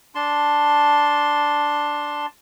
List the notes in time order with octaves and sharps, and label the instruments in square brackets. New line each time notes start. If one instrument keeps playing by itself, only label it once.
[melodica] D4 A5 C6